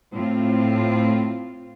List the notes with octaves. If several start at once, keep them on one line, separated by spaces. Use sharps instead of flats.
A2 C4 F4